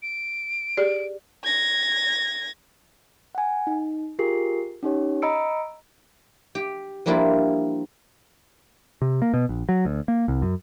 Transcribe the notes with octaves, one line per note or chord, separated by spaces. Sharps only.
D7
G4 G#4 D5
G#6 A#6
F#5 G#5
D#4
F4 G4 G#4 A#4 C7
C#4 D#4 G4 C#5
D#5 A#5 B5 E6 C#7 D7
G4
F3 G3 A#3 D4 E4 F4
C3
A#3
B2
A#1
F#3
D2
A#3
C2
F#2